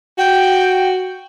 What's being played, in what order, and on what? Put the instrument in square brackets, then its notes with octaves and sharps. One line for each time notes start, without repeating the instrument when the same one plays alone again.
[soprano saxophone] F#4 [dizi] G5